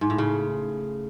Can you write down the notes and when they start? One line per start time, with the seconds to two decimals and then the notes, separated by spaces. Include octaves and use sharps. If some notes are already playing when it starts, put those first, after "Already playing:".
0.01 G#2
0.10 A2
0.18 C#3